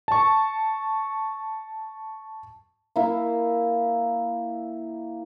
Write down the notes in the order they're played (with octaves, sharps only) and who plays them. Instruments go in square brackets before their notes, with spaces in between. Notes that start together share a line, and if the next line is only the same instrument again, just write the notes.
[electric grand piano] A5 C#6
[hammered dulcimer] A#3 E4